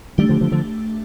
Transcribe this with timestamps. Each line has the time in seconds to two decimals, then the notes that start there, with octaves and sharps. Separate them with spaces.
0.18 D#3 G3 A3 D4 G4
0.29 D3 F3
0.41 D3 F3
0.52 D3 F3 A3